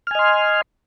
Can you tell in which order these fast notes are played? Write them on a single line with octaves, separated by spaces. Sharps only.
F6 G#5 D#5 C6